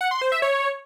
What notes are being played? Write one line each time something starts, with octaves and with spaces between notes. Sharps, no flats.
F#5
C6
C5
E5
C#5